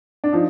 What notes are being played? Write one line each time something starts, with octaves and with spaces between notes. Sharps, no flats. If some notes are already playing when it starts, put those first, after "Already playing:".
D4
F3 D#4